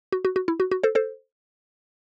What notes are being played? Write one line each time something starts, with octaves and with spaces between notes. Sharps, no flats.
F#4
F#4
F#4
E4
F#4
F#4
A4 C5
A4 C5